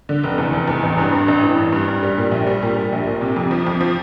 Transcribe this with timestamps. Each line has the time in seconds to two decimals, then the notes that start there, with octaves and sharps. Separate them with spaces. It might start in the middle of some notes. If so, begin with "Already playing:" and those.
0.09 D3
0.24 F1
0.38 E2
0.53 F1
0.68 E2
0.83 A1
0.98 G2
1.13 G2
1.28 A1
1.43 E3
1.58 G2
1.72 G2
1.88 G2
2.03 G3
2.17 A#2
2.31 A#1
2.47 G3
2.62 A#2
2.76 G3
2.92 A#1
3.07 A#2
3.21 C3
3.36 F2
3.51 F3
3.67 F2
3.81 F3